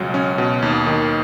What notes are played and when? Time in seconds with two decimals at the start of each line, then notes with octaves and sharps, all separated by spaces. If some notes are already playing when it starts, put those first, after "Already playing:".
Already playing: C#2 B2 F#3
0.14 C#4
0.38 B2
0.62 D#2
0.87 D#3